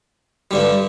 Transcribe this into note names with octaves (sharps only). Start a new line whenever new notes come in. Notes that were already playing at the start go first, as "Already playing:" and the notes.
G2 D3 G3